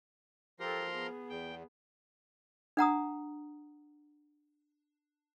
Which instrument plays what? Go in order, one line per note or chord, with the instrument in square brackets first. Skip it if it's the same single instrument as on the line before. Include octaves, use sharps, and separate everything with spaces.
[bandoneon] F3 A#4 [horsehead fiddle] G4 A4 [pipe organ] A#5 C6
[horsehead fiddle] B3 G#4
[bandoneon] E2 [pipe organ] G5
[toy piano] D4 F#5 A#5 D#6